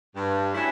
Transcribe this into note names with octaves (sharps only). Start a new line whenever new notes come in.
G2
F#3 A3 C#4 E4